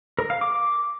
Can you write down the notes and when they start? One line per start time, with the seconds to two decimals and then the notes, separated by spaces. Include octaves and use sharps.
0.19 A#4
0.30 F5
0.41 D6